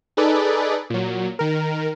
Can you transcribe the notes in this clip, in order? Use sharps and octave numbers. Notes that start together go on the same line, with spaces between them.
D#4 G#4 A4 B4 D5
A#2 F#3
D#3 A#4